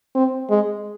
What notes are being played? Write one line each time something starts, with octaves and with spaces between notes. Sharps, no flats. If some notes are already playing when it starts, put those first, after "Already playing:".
C4
G#3